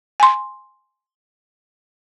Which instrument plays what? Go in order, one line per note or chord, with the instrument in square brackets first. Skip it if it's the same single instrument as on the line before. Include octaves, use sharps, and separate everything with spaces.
[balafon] G#5 C6